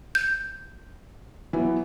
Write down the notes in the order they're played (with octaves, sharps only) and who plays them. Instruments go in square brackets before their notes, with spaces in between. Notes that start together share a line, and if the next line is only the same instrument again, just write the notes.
[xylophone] G6
[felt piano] E3 F#3 B3